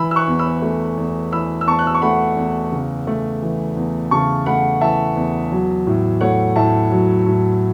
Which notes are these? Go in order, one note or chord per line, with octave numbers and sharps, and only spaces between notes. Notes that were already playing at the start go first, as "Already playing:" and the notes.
Already playing: E3 B5 E6
E6
C#6 F#6
E2
B5 E6
A3
E2
E3 B5 E6
E6
E2 A5 C#6
F#6
E6
C#6
A3 F#5 B5
E2
C#3
A3
E3
E2
C#3 A5 C#6
A3 F#5 B5
E3 E5 A5
E2
F#3
A2
A3 C#5 F#5
A2 E5 A5
F#3
A2